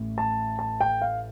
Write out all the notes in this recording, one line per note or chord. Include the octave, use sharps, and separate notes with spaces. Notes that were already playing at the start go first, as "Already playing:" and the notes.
Already playing: A1 A2
A5
A5
G5
F5